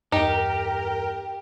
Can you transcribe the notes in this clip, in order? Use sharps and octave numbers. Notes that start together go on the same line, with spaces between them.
E2 G2 D#4 G4 A#4